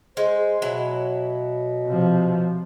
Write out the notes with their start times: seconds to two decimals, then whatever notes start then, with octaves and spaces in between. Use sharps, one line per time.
0.17 G#3 C5
0.62 B2 F#3 E4
1.86 C3 F3